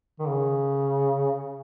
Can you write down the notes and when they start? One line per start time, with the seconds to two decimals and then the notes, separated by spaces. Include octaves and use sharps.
0.20 D#3
0.27 C#3